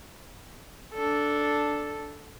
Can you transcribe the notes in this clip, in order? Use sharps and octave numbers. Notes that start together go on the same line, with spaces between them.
D4 A4